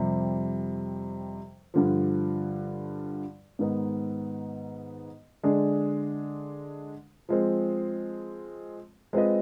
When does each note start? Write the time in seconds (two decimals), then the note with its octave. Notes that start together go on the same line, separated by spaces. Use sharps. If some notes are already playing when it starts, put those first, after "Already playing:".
Already playing: F2 C3 G3
1.74 G2 D3 F3
3.59 G#2 D#3 B3 D#4
5.43 D3 G#3 D4 G#4
7.29 F3 G#3 C4
9.13 G#3 C4 F4 B4 D#5